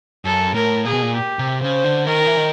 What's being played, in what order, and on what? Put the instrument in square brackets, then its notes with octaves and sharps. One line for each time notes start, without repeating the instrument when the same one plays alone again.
[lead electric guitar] F#2 [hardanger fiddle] A4
[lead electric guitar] A2 [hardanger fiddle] A#4
[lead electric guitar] A#2 [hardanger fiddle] G#4
[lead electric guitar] B2
A#2
[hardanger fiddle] G4
[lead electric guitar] C3
[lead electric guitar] C#3 [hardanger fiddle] C5
[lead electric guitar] D3
[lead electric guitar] D#3 [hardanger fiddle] A#4
[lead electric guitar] E3
D#3